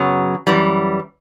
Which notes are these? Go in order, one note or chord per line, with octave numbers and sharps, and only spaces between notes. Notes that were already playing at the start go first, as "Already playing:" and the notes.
Already playing: F#2 C#3 F#3 B3
F#2 E3 G3